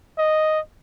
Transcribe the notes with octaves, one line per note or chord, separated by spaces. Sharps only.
D#5